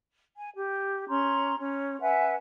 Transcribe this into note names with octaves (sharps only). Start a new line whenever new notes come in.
G#5
G4
C#4 A#5 C6
C#4
B4 E5 F#5 G#5